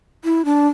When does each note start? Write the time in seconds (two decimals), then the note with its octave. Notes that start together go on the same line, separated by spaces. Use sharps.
0.24 E4
0.45 D4